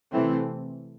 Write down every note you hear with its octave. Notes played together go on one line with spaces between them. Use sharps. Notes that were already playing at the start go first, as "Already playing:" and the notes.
C3 E3 A3 C4